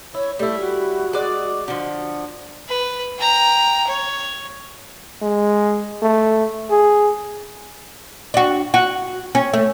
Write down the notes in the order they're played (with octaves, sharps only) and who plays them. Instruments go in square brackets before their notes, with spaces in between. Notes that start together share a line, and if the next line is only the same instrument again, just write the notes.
[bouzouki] E4 [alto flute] C#5
[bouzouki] G3 E4 [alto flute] A3
[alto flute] F#4
[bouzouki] G#3 D5
D3 F3
[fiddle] B4
G5 A#5
C#5
[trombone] G#3
A3
G#4
[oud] D4 F#4
F#4
C#4
A3